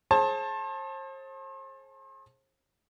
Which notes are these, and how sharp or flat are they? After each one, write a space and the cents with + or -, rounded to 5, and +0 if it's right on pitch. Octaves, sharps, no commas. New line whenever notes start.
G#4 +25 C5 +40 A5 +0